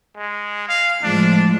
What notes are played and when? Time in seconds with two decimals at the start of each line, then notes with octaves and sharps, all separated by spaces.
0.16 G#3
0.69 F5
1.03 A2 F3 G#3 D4